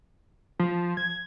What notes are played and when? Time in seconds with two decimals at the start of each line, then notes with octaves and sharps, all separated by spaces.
0.59 F3
0.97 G#6